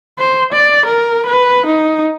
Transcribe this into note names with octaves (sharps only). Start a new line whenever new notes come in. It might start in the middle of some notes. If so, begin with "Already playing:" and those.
C5
D5
A#4
B4
D#4